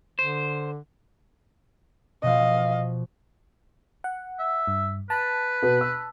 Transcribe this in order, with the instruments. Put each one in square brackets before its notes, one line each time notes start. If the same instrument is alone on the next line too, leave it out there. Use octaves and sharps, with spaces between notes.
[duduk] D3 [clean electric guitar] C5
[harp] B2 F3 [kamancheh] D#5 F5
[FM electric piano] F#5
[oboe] E5
[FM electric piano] G2
[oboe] B4 [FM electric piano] A5
[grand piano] B2 B3
E6